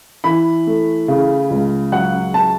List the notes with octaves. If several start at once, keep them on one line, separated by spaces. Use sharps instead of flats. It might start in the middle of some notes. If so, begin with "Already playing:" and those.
E3 B5
A3
C#3
C#2
F#3 F#5
A5